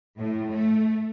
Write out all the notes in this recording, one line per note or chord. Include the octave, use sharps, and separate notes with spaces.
A2
A3